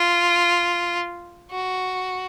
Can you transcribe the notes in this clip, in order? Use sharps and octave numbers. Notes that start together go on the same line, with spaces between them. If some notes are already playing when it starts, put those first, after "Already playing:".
Already playing: F4
F#4